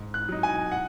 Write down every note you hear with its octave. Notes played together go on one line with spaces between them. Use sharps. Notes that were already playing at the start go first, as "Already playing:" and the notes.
Already playing: G#2
F#6
F#3 D#4
G#5
F#5